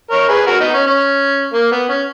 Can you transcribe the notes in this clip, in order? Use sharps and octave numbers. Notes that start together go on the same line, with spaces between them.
A#4 C#5
G#4 B4
F#4 A#4
B3 D#4
C#4
C#4
A#3
B3
C#4